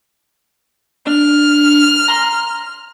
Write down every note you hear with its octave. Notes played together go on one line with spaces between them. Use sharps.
D4 F6
A#5 C6